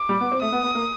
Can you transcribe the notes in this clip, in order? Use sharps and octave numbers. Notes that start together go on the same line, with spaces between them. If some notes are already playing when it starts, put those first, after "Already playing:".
Already playing: D6
G3
B3
C4
A3 D#6
B3
B3
A#3